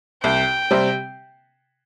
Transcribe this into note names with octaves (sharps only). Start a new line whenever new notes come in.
C2 G5
C3 G3 C4